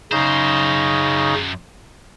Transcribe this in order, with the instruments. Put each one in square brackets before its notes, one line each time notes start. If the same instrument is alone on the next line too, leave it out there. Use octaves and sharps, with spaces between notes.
[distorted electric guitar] F#2 C5 [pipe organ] C#3 D#4 A#5